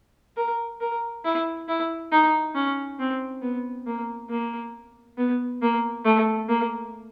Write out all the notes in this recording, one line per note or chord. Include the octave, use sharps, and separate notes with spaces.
A#4
A#4
E4
E4
D#4
C#4
C4
B3
A#3
A#3
B3
A#3
A3
A#3